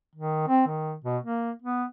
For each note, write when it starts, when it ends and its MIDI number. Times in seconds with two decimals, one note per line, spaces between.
0.15 0.46 51
0.48 0.65 60
0.67 0.94 51
1.04 1.18 47
1.23 1.51 58
1.62 1.84 59